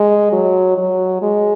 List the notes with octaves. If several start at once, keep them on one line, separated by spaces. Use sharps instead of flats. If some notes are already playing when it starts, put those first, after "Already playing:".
Already playing: G#3
F#3
F#3
G#3